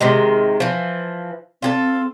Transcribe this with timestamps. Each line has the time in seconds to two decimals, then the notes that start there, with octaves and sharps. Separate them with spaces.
0.01 C3 D#3 G#3
0.60 E3 F3
1.62 C4 F4 G#4 A4